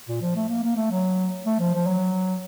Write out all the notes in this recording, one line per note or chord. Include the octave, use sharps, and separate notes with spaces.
A#2
F3
A3
A#3
A#3
A3
F#3
A3
F3
F3
F#3